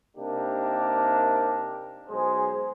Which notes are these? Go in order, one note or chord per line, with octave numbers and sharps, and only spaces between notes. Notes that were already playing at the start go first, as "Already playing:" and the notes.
C3 A#3 D4 D#4 G4 A#4
B1 G#3 G#4 C5